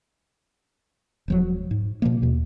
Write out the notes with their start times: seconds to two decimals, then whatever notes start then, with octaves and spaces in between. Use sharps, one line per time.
1.28 E1 F3 F#3
1.71 G#2
2.02 B2 F3 A#3
2.22 D#2 B2